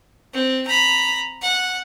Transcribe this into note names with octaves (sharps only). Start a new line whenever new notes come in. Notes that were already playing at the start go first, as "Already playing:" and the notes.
C4
A#5 B5
F#5